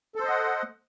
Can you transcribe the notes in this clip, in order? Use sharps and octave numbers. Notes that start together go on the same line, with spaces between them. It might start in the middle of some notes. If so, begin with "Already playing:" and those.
A4 C5 D#5 F#5